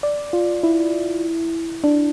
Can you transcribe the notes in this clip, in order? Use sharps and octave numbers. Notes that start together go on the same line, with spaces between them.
D5
F4
E4
D4